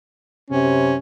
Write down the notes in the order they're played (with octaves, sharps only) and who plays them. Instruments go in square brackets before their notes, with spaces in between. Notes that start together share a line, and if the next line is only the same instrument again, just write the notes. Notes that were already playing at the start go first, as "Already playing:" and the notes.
[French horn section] F#2 C3 [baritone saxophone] C#4